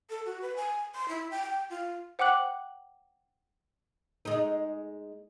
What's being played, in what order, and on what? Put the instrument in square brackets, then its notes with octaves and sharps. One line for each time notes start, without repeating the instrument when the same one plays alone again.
[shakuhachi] A4
F#4
B4
G#5
C6
E4
G5
G5
F4
[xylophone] C5 F#5 G5 D6 F#6 F#7
[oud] G#3 D#4